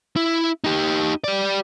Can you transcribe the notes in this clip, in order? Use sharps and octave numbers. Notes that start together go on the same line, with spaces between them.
E4
D#4 G4
G4 D5